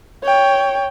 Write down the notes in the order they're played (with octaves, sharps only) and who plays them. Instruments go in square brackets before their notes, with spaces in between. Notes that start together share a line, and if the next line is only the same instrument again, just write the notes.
[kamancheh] C#5 G5